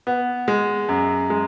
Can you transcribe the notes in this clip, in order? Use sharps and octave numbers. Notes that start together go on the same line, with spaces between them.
B3
G#3
F#2
G#3